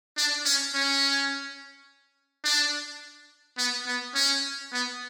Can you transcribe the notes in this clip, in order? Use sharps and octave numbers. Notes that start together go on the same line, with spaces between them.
D4
C#4
C#4
D4
B3
B3
C#4
B3